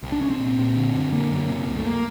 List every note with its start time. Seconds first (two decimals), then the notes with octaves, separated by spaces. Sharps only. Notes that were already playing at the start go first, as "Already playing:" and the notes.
0.03 C2
0.12 D4
0.21 C2 C#4
0.30 C4
0.39 A#2
0.57 A#2
0.75 D3
0.94 F#2
1.12 D3 A#3
1.31 F#2
1.49 C3
1.68 C2
1.77 A3
1.86 A#3